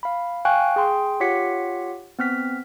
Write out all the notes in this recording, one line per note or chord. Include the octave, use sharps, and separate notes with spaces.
F5 B5
F5 G5 G#5 C#6 F#6
G#4 G5 C6
F4 G4 C#5 F#5 B6 C#7
B3 C4 F6 B6